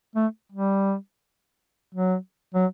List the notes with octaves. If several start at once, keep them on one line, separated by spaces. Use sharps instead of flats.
A3
G3
F#3
F#3